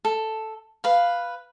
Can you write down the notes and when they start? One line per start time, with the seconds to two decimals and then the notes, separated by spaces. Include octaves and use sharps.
0.05 A4
0.84 B4 F5